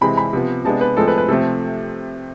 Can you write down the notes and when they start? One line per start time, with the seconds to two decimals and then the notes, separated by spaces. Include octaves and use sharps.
0.01 C3 E3 G#3 C4 B5
0.17 B5
0.33 C3 F3 B3
0.65 C3 G#3 B3 D4 A5
0.81 B4
0.97 A2 F3 G#3 C4 A4
1.08 B4
1.18 B4
1.28 C3 F3 A3 C4 A4